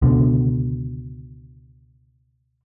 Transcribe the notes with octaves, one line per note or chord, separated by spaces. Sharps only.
C#2 B2 D3